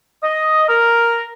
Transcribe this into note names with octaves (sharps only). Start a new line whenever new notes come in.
D#5
A#4